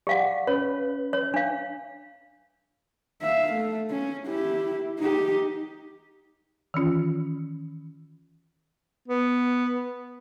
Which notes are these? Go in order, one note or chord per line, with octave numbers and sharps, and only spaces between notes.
G4 D5 F5 F#5
C#4 B4 C#5
C#5
D4 F5
E5 F5
A3
C#4
E4 G4
D#4 G4
D#3 E3 C#4 F4
B3